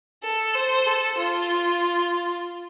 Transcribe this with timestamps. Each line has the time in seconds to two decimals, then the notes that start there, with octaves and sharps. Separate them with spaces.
0.24 A4
0.55 C5
0.87 A4
1.19 F4